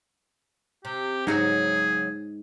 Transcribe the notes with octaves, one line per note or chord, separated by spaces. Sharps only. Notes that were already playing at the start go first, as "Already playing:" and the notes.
C3 G4
G#2 C#3 F#3 D#4 F#4 G#4